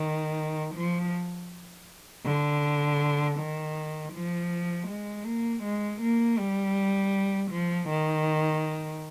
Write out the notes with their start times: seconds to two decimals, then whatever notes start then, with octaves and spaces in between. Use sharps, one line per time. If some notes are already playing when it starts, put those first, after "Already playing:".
Already playing: D#3
0.75 F3
2.25 D3
3.38 D#3
4.13 F3
4.88 G#3
5.25 A#3
5.63 G#3
6.02 A#3
6.38 G3
7.51 F3
7.89 D#3